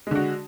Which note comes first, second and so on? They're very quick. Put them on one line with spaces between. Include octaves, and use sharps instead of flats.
G#3 D3 F#4